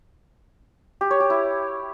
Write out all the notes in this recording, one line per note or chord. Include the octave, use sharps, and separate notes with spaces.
G4
C#5
G4
E4